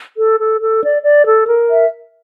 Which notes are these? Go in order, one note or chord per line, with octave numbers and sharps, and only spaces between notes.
A4
A4
A4
D5
D5
A4
A#4
E5